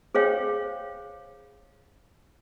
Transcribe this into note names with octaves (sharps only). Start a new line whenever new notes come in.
G#4 C5 C#5 F5 G5